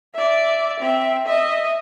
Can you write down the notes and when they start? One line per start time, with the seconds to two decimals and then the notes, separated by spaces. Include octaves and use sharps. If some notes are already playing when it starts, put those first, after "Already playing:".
0.14 D5 E5
0.79 C4 E5
1.26 D#5 E5